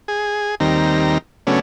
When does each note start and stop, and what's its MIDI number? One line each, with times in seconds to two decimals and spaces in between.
0.08 0.55 68
0.60 1.18 39
0.60 1.18 51
0.60 1.18 55
0.60 1.18 60
0.60 1.18 82
1.47 1.60 49
1.47 1.60 54
1.47 1.60 57
1.47 1.60 59
1.47 1.60 61
1.47 1.60 62